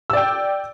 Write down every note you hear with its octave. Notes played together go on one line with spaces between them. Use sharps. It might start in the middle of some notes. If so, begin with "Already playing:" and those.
D5 G5 E6